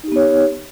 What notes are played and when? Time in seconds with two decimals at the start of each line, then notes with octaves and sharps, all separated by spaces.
0.04 D#4
0.08 G4
0.12 B3
0.16 C#5